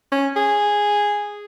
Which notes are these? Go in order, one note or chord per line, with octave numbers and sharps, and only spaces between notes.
C#4
G#4